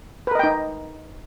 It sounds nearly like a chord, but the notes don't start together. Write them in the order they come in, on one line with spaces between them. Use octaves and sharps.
B4 A#4 D#5 G5 D#4